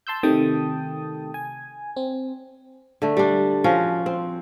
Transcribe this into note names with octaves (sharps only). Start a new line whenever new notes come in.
A5 C6 E6 G6
C3 D#3 A3 G5 A5 D#6
G#5
C4
D3 A3
G3 D4
F3 C#4 F#4
C4